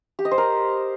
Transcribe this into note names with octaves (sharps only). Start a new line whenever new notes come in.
G4
D#5
C5
A#4